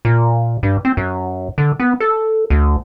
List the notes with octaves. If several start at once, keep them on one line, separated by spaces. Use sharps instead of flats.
A#2
G2
C4
F#2
D3
B3
A4
D2